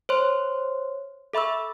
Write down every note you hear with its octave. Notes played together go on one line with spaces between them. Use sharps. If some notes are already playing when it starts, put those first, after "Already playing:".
C5 C#5 C6
A4 E5 B5 C#6 E6